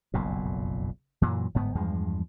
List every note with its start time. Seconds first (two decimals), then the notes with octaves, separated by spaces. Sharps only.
0.14 F#1 B1 F2 A#2
1.22 F#2 A#2 E3 F#3
1.55 G1 G#2 B3
1.75 E2 G2 F3 G#3